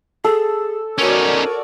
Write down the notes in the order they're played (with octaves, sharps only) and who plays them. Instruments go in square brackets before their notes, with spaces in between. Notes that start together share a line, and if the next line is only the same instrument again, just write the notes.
[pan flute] G#4 [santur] A4
[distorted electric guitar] C#4 D#4 [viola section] F#4 C#5 D5 [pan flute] A#4